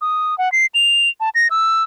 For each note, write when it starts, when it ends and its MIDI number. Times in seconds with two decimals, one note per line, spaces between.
0.01 0.37 87
0.38 0.52 78
0.52 0.66 96
0.75 1.09 101
1.20 1.29 81
1.35 1.48 94
1.51 1.83 88